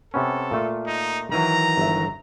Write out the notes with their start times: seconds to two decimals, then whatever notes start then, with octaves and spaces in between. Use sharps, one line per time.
0.14 C3 B3 C#4 A4
0.51 A#2 A3 F4
0.86 D#4
1.32 D#3 E3 F#3 A#5
1.77 G1 E5